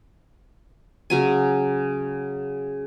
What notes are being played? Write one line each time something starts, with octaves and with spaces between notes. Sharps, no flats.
C#3 F#3 G#5